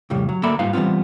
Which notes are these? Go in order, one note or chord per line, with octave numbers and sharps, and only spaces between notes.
F2 A2 C#3 G3
F#3
D2 A#3 A4 D5 E5 B5
G#2 G3 D#4 F4 B4 F5
E3 G3 A3 B3 C4 F4